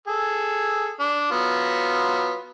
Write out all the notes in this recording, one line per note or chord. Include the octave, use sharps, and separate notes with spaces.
G#4 A4
D4
F#3 B3 F4